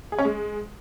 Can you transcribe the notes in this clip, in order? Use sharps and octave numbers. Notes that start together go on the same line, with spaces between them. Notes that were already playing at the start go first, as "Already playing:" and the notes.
G#4
C#4
G#3